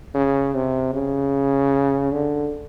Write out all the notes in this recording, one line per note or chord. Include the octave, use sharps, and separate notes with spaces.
C#3
C3
C#3
D3